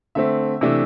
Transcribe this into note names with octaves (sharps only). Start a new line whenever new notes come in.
D3 A3 C4 E5
C3 E3 A3 D4